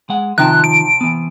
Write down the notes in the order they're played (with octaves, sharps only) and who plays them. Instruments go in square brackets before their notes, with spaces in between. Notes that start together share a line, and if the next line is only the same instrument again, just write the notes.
[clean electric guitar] G#3 F#5
[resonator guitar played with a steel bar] C3 G5 A5 [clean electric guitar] D#3 F3 D#4 [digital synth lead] F#6
[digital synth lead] D7
[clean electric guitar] E3 B3